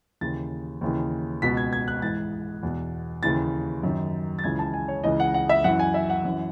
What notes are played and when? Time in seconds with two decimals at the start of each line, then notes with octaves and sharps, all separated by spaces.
0.21 D#2 C#3 E3 A6
0.81 D#2 C#3 E3
1.42 C#2 B2 B6
1.57 G#6
1.73 G#6
1.88 F#6
2.02 G#2 E3 A6
2.63 E2 B2
3.23 D#2 C#3 E3 A6
3.83 F#2 D#3
4.39 A6
4.44 C#2 C#3 E3 G#6
4.59 A5
4.74 G#5
4.88 C#5
5.04 C#2 C#3 E3 D#5
5.20 F#5
5.34 F#5
5.49 E5
5.64 F#2 E3 F#5
5.79 G#5
5.94 E5
6.10 F#5
6.25 F#2 E3